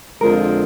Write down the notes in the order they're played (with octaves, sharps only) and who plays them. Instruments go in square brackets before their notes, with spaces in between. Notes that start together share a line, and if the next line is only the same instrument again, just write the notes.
[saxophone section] F2 D3 F3 G#3 [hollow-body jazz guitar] A#4